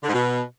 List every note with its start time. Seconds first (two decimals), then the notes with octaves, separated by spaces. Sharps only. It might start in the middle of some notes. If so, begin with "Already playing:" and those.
0.02 D3
0.08 G#2
0.13 B2